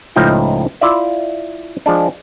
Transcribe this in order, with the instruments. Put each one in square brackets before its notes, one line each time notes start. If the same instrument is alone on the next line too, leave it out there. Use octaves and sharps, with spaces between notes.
[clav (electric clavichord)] C#2 A2 F3 D#4 E4 G5
E4 F4 D5 E5
F3 G#3 D4